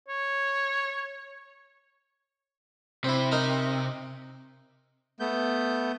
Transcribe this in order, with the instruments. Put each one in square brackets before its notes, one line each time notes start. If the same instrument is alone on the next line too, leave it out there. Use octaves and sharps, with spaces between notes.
[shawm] C#5
[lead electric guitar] C3 [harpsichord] C4 E4
[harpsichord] D#4 A#4 D#5
[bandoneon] A3 B3 G6